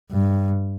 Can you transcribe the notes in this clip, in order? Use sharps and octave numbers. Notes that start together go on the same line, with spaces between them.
G2